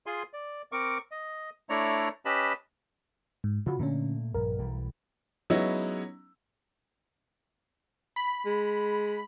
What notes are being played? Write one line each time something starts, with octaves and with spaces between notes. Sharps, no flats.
F4 G#4 G#5 C6
D5
C4 A#4 C#6 D6
D#5
A3 D4 E4 C#5 D5 A#5
C#4 G4 B4 D#5 A5 B5
G#2
C#3 F4 F#4
A#2 D3 A3 A#3 C#4
A#1 G2 A#4
B1 E3 G3
F#3 G#3 B3 C#4 D#4 E4
B5
G#3